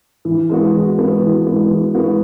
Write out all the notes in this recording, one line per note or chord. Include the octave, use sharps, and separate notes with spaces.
E3
G#3 B3 F#4
E3
G#3 B3 F#4
E3
G#3 B3 F#4
E3
G#3 B3 F#4